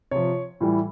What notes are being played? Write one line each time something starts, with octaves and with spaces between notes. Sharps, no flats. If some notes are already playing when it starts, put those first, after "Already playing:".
C3 F3 C#5
A2 E3 G3